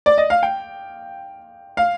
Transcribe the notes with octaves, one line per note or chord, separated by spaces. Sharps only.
D5
D#5
F5
G5
F5